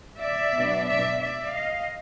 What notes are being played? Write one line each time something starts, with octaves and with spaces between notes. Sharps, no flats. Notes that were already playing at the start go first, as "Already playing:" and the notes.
D5 E5
B2 F#3 B3 D4
D5 E5
D5 E5
D#5 F5